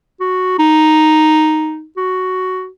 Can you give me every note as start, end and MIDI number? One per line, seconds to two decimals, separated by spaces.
0.20 0.57 66
0.59 1.86 63
1.97 2.68 66